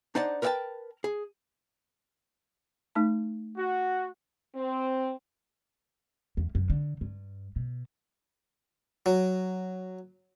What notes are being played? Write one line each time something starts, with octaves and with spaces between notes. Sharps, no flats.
D4 D#4 C5 D5 F#5 A5
A#4 B4 D5 F#5 G5 A5
G#4
A3 D#4 A5
F#4
C4
E2
F#2
D3
G2
B2
F#3